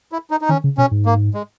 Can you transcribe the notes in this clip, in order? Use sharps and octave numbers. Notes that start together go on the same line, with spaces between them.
E4
D#4
D#4
D#3 C#4
C#3
B2 C#4
G#2
A#3
G#3